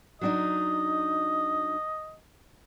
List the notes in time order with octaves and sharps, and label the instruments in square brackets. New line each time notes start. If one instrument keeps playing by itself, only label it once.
[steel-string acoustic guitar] F#3 D4 D#4 [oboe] D#5